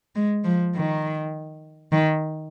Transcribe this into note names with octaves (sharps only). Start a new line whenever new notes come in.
G#3
F3
D#3
D#3